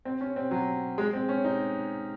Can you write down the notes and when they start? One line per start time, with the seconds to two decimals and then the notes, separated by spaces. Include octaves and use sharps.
0.05 C4
0.21 C#4
0.36 C4
0.51 F#3
0.98 G#3
1.13 C4
1.29 C#4
1.44 D#4